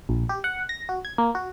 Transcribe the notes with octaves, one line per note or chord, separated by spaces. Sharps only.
A#1
G4
F#5
A#6
F#4
G#6
A#3
F#4